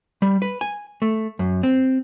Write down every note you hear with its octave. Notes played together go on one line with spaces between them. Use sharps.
G3
B4
G#5
A3
F#2
C4